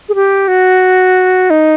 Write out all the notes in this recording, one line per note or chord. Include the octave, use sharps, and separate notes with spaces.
G#4
G4
F#4
D#4